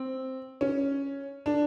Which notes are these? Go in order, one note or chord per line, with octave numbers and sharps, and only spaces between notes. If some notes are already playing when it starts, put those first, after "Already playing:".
Already playing: C4
C#4
D4